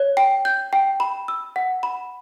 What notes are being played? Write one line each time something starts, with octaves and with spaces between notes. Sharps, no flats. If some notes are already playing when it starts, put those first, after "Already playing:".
Already playing: C#5
G5
G6
G5
B5
E6
F#5
B5